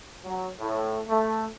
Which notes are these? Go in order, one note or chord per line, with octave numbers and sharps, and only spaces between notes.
F#3
A2
A3